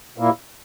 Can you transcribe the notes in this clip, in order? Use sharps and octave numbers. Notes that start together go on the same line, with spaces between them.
A#2 A#3 E4